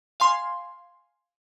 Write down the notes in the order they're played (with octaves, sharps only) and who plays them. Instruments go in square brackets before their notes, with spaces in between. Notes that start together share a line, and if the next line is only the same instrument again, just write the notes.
[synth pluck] F5 G#5 C6